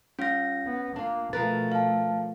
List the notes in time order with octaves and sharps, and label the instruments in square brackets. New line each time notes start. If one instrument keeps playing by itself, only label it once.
[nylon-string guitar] G3 F4 [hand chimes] C#4 A#6
[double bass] B3
[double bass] A#3 [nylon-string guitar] D4 F4
[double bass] B2 A3 [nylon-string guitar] F3 A#4 B4 [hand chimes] A6
[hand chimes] F5 A5